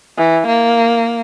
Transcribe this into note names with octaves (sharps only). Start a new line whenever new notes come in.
E3
A#3